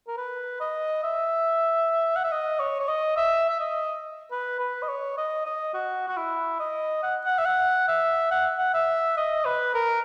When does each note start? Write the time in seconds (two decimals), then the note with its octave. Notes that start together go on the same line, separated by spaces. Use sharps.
0.07 A#4
0.17 B4
0.60 D#5
1.03 E5
2.16 F#5
2.24 E5
2.31 D#5
2.59 C#5
2.80 C#5
2.88 D#5
3.17 E5
3.49 E5
3.60 D#5
4.31 B4
4.59 B4
4.82 D#5
4.88 C#5
5.17 D#5
5.46 D#5
5.74 F#4
6.08 F#4
6.17 E4
6.59 D#5
7.03 F#5
7.25 F#5
7.38 E5
7.45 F#5
7.88 E5
8.31 F#5
8.58 F#5
8.74 E5
9.17 D#5
9.45 B4
9.74 A#4